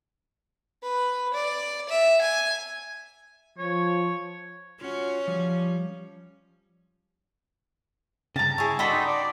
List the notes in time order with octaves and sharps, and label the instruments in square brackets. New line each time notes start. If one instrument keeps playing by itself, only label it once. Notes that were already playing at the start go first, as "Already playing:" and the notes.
[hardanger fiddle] B4
D5
E5
G#5
[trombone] F3 [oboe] C#5
[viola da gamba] C#4 [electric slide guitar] F4 F#4
[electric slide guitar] F3 G3
[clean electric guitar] G2 C#3 [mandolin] A5 A#5
[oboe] E4 [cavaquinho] G#4 C#5
[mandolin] D4 D#5 B5 [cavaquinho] F#4 C6 [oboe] A4 [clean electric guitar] G5
[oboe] D#4
D5